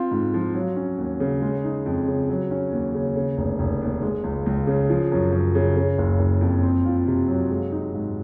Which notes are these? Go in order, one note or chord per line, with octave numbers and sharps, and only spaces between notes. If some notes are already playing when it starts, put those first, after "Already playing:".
Already playing: C4 F4
G#2
F3
F#3
C#4
D#2
C#3
G#3
D#4
F2
C#3
F#3
C#4
D#2
C#3
C#3
F1
F1
D#2
G#3
C#2
C#2
C#3
F3
F#2
F#2
C#3
C#3
F#1
F#1
F2
C4
F4
C3
F#3
G#3
D#4
G#2